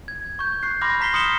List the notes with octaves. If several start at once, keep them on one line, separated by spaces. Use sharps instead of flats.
G#6
C#6 G6
C#6 F#6 C7
B5 C6 D6 F6 A#6
A#5 B6 C7 G7
C6 D#6 F6 C#7 E7 G7